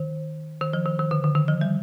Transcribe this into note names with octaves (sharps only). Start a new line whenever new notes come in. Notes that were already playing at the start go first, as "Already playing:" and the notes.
Already playing: D#3
D#3
F3
D#3
D#3
D3
D3
D#3
F3
G3